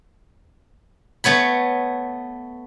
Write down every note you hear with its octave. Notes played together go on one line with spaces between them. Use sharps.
A3 B3 C#5 B5